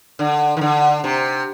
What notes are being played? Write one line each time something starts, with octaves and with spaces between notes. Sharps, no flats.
D3
D#3
D3
C3